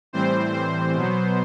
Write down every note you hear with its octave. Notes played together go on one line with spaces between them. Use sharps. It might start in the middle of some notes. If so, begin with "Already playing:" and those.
A2 E3 G3 C4 C5
C5
B2 F#3 B3